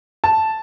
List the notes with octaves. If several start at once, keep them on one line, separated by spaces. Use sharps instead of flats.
A5